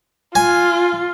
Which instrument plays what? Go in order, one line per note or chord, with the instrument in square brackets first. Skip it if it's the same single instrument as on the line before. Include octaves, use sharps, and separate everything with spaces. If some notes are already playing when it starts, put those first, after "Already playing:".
[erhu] F4 [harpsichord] G#5